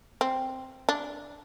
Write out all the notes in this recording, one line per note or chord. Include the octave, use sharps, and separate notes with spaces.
C4
D4